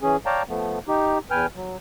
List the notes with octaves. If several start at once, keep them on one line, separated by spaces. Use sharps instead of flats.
E3 C#4 G#4
C#5 D5 F5 G5 A5 A#5
F3 A3 B3
D#4 G4
E2 B4 G5 G#5 F6
F#3